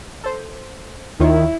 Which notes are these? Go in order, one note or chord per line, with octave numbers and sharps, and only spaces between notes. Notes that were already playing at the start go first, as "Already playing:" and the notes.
A4 C5
D#2 D#3 E4 F4 C#5